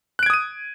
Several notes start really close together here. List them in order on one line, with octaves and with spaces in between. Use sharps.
F#6 D7 G#6 D#6 D#7